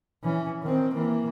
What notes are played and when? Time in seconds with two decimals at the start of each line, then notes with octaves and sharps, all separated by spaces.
0.24 E3 C#4
0.63 D#3 C4
0.94 E3 A#3